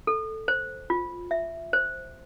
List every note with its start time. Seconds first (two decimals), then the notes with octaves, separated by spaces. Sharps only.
0.07 A4
0.48 C5
0.90 F4
1.31 E5
1.73 C5